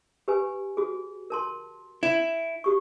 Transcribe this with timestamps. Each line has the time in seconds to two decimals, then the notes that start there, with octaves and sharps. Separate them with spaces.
0.28 G4 B4 G#5
0.77 F#4 G#4
1.30 A#4 A5 C6
2.03 E4
2.64 F#4 G4 C#6